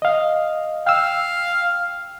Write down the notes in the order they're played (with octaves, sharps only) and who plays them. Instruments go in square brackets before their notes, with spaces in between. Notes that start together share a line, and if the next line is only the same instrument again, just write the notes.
[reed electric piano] D#5 F5
[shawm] F5 [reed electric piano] G5 E6